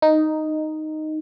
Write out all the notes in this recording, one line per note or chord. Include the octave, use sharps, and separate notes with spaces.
D#4